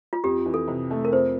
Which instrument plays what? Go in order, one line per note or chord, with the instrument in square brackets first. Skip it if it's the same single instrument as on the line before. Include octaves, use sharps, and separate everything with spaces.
[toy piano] F4
[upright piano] F2 [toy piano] G4
[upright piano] E3
[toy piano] A4
[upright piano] C3
A3
[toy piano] A#4
[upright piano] F2 [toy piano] C5